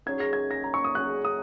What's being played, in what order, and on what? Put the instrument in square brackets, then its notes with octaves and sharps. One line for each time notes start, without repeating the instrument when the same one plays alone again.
[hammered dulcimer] D#3 F#3 C#4 G#4 [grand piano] G#6
[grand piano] A#6
G#6
A#6
A#5
C#6
D#6
[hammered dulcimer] F#3 C#4 G#4 [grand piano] F#6
[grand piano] D#6